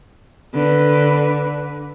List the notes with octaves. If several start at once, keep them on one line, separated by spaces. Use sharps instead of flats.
D3 B4